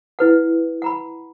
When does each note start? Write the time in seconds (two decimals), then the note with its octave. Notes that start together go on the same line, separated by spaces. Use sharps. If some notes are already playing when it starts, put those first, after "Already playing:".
0.19 E4 B4 F#5
0.82 F#5 A#5 B5